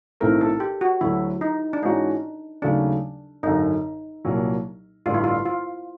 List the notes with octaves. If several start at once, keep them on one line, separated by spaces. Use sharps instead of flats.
B1 A2 E3 A3 C4 A#4
A4
G4
F#4
D2 D3 F#3 E4
D#4
D4
G#2 E3 G#3 C#4 D#4 F#4
D#2 C#3 F#3 A3 D4
G#1 F#2 D3 D#4
C2 A#2 F#3
A1 G2 D3 G3 F4
E4
F4
F4